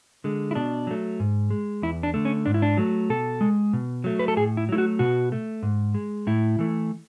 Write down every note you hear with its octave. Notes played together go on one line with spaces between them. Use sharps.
D3 G#3
E4
B2 D4
F#3 A3
G#2
G#3
E2 E4
D4
D3 A3
C#4
G#2 D4
E4
D4
F#3 A3
B2 A4
G#3
B2
F#3 A3
B4
A4
A2 G#4
E4
F#3 A3 E4
F#4
B2 F#4
A3
G#2
G#3
A2 E4
E3 A3